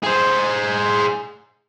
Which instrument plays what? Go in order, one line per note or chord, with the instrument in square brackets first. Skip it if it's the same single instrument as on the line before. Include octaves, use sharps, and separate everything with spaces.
[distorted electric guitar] G#4 C5